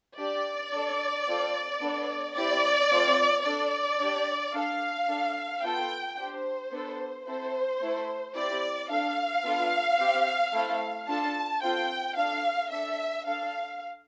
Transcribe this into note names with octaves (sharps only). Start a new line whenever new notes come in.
D4 G4 D5
D4 A4
C4 F4 A4
B3 D4 A4
C4 E4 G4 D5
A3 C4 F4 A4
D4 A4 D5
D4 G4
D4 A4 F5
D4 A4
B3 F4 A4 G5
D4 G4 C5
B3 D4 A4
C4 E4 A4 C5
A3 E4 A4
C4 E4 G4 D5
D4 A4 F5
B3 D4 F4 A4
C4 G4
A3 C4 E4 A4
D4 F4 A4 A5
C4 F4 A4 G5
D4 A4 F5
D4 A4 E5
D4 A4 F5